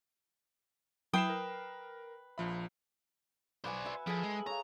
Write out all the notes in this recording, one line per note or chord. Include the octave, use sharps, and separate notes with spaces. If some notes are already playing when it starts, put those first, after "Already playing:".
F#3 E4 B4 G5 D#6 C7 E7
A#4
A#1 F3 E5 B5
B4 C5 D5 F#5 G#5
B4 E5
F3 G#4 A4 G#5
G#3
C#5 F5 A#5